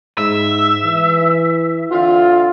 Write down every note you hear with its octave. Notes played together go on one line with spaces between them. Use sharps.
G#2 E5
E3
D3 C4 F4